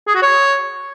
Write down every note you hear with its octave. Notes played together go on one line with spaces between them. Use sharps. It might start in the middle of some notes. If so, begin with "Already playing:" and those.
G#4
F#4
C#5